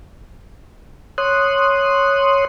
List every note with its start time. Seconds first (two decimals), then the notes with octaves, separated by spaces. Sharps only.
1.18 C#5 C6 D#6 F#6